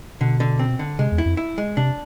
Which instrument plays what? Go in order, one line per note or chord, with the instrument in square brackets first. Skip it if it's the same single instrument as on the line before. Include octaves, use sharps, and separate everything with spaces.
[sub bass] B2 [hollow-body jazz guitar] D3
[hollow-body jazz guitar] D3
C4
D3
[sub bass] C3 [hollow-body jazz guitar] G#3
[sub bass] E2
[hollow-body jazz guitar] E4
[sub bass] F2
[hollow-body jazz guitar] E4
G#3
[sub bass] C3 [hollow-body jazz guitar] D4